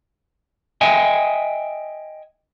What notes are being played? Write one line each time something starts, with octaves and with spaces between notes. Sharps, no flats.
D#5 E5 G5 G#5